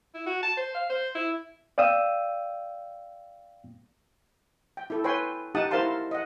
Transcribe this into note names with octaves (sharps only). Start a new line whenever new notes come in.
E4
F#4
A5
C5
F5
C5
E4
D5 F5 G5 D#6 E6
G5
E4 A4
B4 C#5 G5 G#5 C6
D#4 G4 F#5 A5 D#6
E4 A#4 C5 F5 A5 C6
D#5 F#5